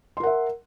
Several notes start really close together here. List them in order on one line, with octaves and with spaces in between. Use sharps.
C6 A#4 F#5 E5